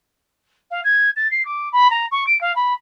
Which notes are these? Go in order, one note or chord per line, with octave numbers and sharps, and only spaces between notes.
F5
G#6
A6
C7
D6
B5
A#5
C#6
D7
F5
B5